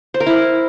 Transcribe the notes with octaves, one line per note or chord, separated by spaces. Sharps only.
C5
A#4
E4